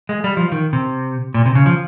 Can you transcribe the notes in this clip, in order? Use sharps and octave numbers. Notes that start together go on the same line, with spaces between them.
G#3
G3
F3
D#3
C3
A#2
C3
C#3
F3